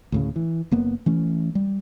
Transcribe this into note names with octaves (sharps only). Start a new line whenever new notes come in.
D2 A2 C#3
E3
F#1 A#3 B3
E3 A3 C#4
G3